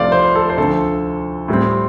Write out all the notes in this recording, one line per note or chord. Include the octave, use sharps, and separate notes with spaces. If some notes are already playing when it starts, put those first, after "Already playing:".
Already playing: C2 C3 F3 A3 C4 D5 F5
C5
A4
C5
D2 D3 F3 C4 A4
A2 G3 C4